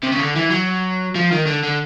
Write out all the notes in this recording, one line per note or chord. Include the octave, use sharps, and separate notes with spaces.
C3
C#3
D3
E3
F#3
F3
D#3
D3
D3